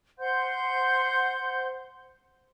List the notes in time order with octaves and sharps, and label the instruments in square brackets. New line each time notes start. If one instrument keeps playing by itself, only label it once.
[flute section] C5 F#5 C6 G6